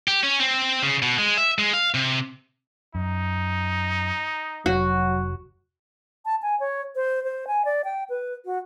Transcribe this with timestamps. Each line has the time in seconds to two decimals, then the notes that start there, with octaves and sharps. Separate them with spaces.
0.08 G4
0.23 C#4
0.40 C4
0.82 C#3
1.02 B2
1.19 G#3
1.37 E5
1.59 G#3
1.73 F5
1.94 C3
2.95 F#2 D#4
4.66 F1 F#3 F#4
6.25 A5
6.42 G#5
6.60 C#5
6.96 C5
7.24 C5
7.47 G#5
7.65 D5
7.84 G5
8.09 B4
8.45 F#4